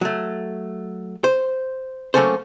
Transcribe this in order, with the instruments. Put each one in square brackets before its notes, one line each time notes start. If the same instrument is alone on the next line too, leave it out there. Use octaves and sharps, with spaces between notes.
[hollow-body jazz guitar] F#3 A3
C5
F#3 A3 A#3 C#4 A4 C5